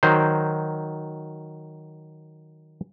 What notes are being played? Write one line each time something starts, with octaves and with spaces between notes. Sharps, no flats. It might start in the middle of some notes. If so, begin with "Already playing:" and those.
D#3 F#3 C5